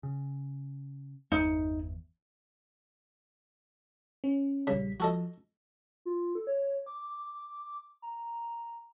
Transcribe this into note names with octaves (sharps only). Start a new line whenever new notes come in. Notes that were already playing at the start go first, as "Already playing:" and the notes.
C#3
G1 E2 D#4
C#4
A#1 C#3 G3 B6
F3 F#4 A4 D#5
F4
A4
C#5
D6
A#5